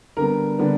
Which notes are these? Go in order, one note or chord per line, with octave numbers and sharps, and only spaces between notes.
D3 G3 B3 A#4
D3 G3 B3